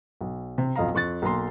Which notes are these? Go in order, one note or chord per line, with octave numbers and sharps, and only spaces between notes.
B1
C3
B1 F2 D#5 F5 A#5
F2 C#6 F#6 A6
B1 A#3 A#5 C6